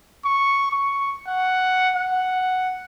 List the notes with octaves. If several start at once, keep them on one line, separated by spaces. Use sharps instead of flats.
C#6
C#6
F#5
F#5